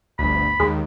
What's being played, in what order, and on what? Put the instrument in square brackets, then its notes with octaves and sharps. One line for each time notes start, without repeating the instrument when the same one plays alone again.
[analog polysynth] G1 D2 [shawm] B5
[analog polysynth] D#2 [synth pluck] G#3